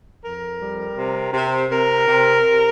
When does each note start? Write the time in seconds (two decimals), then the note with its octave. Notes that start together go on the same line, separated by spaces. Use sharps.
0.24 F2 A#4
0.60 G3
0.97 C3
1.34 C3
1.70 C3 A#4
2.08 C3
2.44 C3